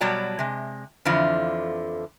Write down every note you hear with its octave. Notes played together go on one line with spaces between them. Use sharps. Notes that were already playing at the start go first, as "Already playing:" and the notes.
B2 F#3 G3 D5 A5 A#5
C3 G#3
F2 D3 E3 F3